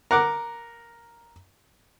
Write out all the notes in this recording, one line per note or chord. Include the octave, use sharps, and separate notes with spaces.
A#4 F#5 D6